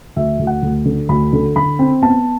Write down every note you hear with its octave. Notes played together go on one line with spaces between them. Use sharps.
D2 E5
D2
F#5
D2
D3
D2 B5
D3
D3 B5
C4
B3 A5